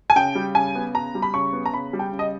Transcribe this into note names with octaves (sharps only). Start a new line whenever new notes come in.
G#5
C#3 G5
G3
C#3 G#5
B3
C#3 A#5
G3
B5
C#3 C#6
B3
A#5
C#3 B5
G3
G5
C#3
D#5